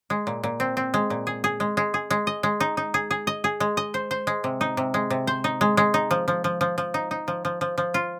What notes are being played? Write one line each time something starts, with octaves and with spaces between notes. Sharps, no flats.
G#3
A#2
A#2
C4
C4
G#3
A#2
G#4
G#4
G#3
G#3
G#4
G#3
D#5
G#3
D#4
D#4
G#4
G#4
D#5
G#4
G#3
D#5
C5
C5
G#3
C3
D#4
C3
G#3
C3
C5
D#4
G#3
G#3
D#4
F3
F3
F3
F3
F3
D#4
D#4
F3
F3
F3
F3
F4